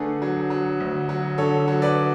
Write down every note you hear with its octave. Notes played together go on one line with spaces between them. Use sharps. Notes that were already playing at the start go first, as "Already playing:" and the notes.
Already playing: D3 A3 G#4 B4
F#3
F#3
D2
F#3
D3 A4 C#5
F#3
B4 D5